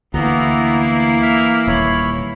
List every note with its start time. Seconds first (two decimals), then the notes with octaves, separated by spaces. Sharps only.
0.14 D2 E3 A#3 B3 E4 A#5
1.22 E5 F6
1.68 D#1 C#5 B5